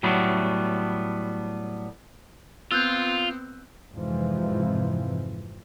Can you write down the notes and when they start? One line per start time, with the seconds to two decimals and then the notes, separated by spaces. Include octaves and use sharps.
0.03 A2 F#3 G3 A3 B3
2.71 B3 C4 F4 E6 F#6 G6
3.93 F2 G#2 C3 E3 F3